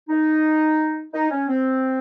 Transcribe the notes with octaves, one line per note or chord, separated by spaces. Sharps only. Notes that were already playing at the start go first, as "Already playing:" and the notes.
D#4
D#4
C#4
C4